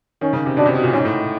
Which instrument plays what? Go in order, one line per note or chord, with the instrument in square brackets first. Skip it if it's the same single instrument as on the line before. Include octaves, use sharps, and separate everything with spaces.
[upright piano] D#3 [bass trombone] C#4
[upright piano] C#3
C3
[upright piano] B2 [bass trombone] D4
[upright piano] C3
B2
A#2
[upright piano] G#2 [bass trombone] C#4
[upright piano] A2